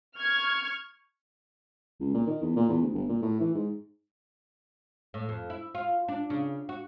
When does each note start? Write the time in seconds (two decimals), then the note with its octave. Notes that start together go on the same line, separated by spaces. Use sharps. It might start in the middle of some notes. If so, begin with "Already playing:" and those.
0.17 C#6 F6 G#6
2.00 C#2
2.14 A#2
2.27 D#3
2.42 E2
2.56 A#2
2.69 E2
2.82 D2
2.94 G1
3.09 A#2
3.22 A2
3.41 E3
3.55 G#2
5.14 A2
5.29 F2
5.50 E4
5.75 F4
6.08 D4
6.30 C#3
6.69 F#4